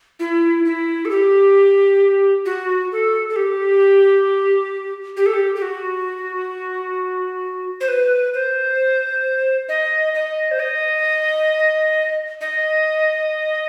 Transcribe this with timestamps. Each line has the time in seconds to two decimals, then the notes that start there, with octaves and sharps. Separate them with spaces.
0.20 E4
0.65 E4
1.05 A4
1.11 G4
2.46 F#4
2.92 A4
3.29 A4
3.36 G4
5.17 G4
5.26 A4
5.34 G4
5.56 G4
5.62 F#4
7.81 C5
7.88 B4
8.34 C5
9.69 D#5
10.14 D#5
10.51 C5
10.59 D#5
12.41 D#5